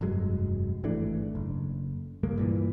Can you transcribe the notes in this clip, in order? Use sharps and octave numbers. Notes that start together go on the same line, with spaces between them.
F1 G2 F#3 G#3
G#1 E3 A3 D4
F#1
C#2 G2 G#3 A#3
G2 A#2 E3